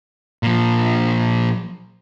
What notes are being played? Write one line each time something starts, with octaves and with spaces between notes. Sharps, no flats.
A#2 F3